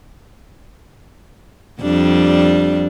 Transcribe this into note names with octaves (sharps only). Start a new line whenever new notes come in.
F2 G3 D4